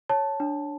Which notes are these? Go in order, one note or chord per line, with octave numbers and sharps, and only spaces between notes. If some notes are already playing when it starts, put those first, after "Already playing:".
C#5 A5
D4